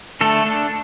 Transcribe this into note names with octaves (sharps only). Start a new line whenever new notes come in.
D3 A3 A4
A3 D4